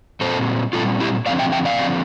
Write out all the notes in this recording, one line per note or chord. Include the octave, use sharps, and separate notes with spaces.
A#2 G3 C4 A4 C5
A#2 G3 C4 F4 A4
E4 G4
D3 F3 C4 D5 F5
E5 G5
E5 G5
D5 F5
D3 F3 C4